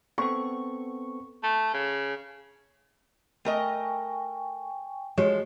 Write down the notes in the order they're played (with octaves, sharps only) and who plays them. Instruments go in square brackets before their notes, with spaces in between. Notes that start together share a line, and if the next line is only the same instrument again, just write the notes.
[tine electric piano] B3 C4 A4 [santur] C#6
[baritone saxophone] A3
C#3
[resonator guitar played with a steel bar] A3 A#4 D#5 [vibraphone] G5 G#5 C#6
[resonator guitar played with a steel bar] F3 [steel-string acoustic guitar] G#3 [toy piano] F#4 G4 C#5